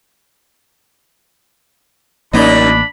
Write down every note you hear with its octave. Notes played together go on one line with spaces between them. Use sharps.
A1 F#2 A#3 D4 D#4 D5 B5